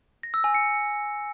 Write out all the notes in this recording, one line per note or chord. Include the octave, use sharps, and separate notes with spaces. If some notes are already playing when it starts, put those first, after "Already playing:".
A#6
E6
G#5
C#7